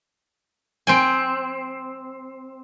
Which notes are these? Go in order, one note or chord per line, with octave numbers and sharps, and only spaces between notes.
C4 G5 G#5